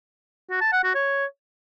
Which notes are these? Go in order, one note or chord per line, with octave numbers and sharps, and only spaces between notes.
F#4
A5
F#5
F#4
C#5